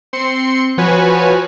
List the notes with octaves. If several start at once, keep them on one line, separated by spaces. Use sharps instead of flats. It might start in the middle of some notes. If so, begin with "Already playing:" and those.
C4 C6 C#7
F3 F#4 B4 C#5 G#5